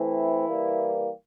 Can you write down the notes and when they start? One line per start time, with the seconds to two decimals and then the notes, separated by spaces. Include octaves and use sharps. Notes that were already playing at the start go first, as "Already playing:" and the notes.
Already playing: E3 A3 C4 E4
0.48 E3 G3 A#3